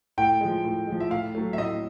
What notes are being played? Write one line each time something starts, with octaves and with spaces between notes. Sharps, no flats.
A2 G5
F3 G#3
A2
F3 G#3
E5
A2 F5
F#3 A3
E5
A2 D#5